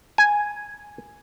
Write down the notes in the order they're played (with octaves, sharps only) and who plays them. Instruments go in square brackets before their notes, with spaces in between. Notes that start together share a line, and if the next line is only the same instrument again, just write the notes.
[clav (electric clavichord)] G#5